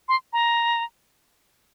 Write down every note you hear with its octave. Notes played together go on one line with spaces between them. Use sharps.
C6
A#5